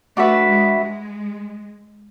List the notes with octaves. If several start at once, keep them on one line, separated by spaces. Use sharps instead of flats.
A3 D4 F#4 B4 E5
G#3
G#3